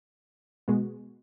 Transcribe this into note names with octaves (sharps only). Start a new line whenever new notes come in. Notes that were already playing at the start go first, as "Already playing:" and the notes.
B2 G#3 B3 F#4